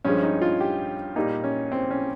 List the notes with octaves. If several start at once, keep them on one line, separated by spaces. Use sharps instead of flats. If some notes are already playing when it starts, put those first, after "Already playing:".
G2 F3 G#3 C#4
D#4
F4
G4
A#2 G3 D#4
C#4
C4
C#4